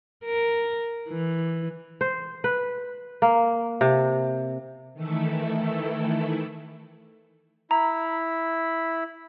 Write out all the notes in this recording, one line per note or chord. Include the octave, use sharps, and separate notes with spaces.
A#4
E3
C5
B4
A#3
C3
D#3 E3 A3 E4 A4
E4 A#5 B5